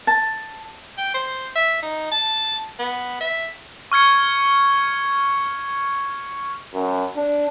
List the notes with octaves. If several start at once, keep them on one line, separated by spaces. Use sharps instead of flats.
A5
G5
C5
E5
D#4
A5
B3
E5
C#6 F6 G#6 C#7
F#2
D4